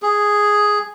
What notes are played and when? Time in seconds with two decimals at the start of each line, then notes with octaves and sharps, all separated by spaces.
0.02 G#4